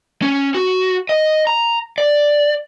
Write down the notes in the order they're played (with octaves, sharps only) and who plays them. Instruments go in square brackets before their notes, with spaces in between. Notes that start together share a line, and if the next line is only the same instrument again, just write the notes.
[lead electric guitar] C#4
F#4
D#5
A#5
D5